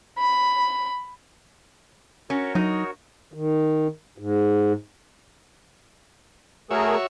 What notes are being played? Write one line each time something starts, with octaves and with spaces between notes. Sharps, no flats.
B5
C#4 F#4 A#4 C#5
F#3 D#4
D#3
G#2
A3 F#4 G#4 A#4 C#5 E5